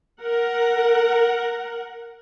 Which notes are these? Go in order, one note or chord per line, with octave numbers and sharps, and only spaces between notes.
A#4 F#5